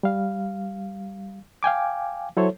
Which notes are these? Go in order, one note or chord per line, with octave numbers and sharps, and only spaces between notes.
G3 F5
F5 G5 G#5 D6
F#3 E4 A4 C5 C#5